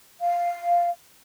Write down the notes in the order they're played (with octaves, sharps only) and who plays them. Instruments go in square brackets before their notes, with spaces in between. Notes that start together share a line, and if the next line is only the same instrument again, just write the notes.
[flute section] F5